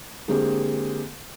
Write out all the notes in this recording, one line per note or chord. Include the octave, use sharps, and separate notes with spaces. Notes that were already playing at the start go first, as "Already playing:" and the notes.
D3 G#3 A#3 C4 G4 G#4